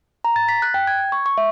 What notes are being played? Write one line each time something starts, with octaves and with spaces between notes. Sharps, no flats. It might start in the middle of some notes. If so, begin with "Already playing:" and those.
A#5
A6
B6
F#6
G5
G#6
C#6
C#6
E5